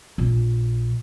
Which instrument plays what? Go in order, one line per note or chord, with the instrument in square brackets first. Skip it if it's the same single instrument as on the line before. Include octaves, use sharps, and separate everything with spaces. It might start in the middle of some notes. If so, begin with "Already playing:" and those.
[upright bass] A#1